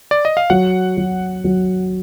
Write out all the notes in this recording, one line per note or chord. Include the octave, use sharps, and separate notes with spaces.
D5
D#5
F5
F#3 F#5
F#3
F#3